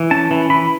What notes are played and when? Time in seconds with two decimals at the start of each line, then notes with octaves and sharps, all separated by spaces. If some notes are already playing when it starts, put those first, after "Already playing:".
Already playing: E3
0.11 C#4 A5
0.31 E3
0.50 E3 B5